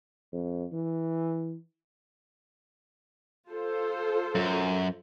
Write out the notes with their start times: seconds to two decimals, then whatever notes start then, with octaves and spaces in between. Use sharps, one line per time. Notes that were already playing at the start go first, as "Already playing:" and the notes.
0.32 F2
0.72 E3
3.48 F4 A4 C5
4.35 F#2